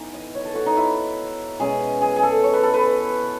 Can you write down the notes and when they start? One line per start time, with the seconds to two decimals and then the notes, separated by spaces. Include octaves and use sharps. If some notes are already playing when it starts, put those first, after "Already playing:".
Already playing: E3 B3 D#4
0.14 D#5
0.35 C#5
0.45 A4
0.55 F#4
0.66 D#4
0.77 E4
1.60 B2 G#3 C#4 G#4
2.01 G#4
2.16 G#4
2.23 A4
2.44 C#5
2.53 B4
2.63 A4
2.74 B4